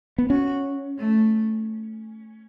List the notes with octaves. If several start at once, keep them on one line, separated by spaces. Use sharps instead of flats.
B3
C#4 F#4
A3